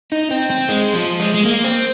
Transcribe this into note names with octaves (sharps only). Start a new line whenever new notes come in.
D#4
C4
C4
G#3
F3
G#3
G#3
A#3
C4